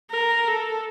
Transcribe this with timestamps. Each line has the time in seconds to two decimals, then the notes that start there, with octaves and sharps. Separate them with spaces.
0.11 A#4
0.48 A4